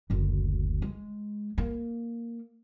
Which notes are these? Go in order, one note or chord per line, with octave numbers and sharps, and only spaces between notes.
F#1 D2
G#3
A#3